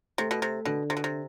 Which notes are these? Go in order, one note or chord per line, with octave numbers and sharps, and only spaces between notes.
C3 A3
B2
C3
B2 D3
C3
B2
C3